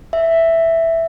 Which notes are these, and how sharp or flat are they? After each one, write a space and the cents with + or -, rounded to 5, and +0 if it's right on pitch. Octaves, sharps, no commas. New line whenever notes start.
E5 +0